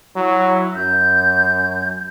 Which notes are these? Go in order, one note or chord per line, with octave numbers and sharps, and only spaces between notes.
F#3 E4
F#2 G6